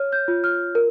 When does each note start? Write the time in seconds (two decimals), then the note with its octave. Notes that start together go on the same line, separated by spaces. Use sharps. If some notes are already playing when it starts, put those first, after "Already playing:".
Already playing: C#5 F6
0.13 G6
0.28 F4
0.44 F6
0.75 A#4